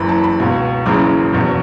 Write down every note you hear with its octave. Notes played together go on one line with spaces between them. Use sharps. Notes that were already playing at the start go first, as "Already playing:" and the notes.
Already playing: F#1 F#2 E3 B5
A5
B5
C#2 B2
F#1 F#2 C#3 E3 D6
F#1 E2 B2